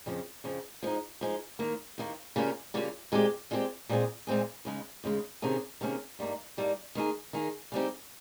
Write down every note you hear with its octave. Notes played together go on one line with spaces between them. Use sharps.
F2 C#3 F3
F2 C#3 F3
F3 G#3 D#4
F3 G#3 D#4
D#2 D#3 A#3
D#2 D#3 A#3
C#3 G3 A#3 C#4 F4
C#3 G3 A#3 C#4 F4
A#2 G#3 C4 G4
A#2 G#3 C4 G4
A#2 G#3 C4 F4 G#4
A#2 G#3 C4 F4 G#4
D#2 C#3 G#3
D#2 C#3 G#3
C3 D#3 A#3 C#4 G#4
C3 D#3 A#3 C#4 G#4
G2 G3 A#3 D#4
G2 G3 A#3 D#4
D#3 A#3 D#4 G#4
D#3 A#3 D#4 G#4
C#3 G3 C4 D#4 G4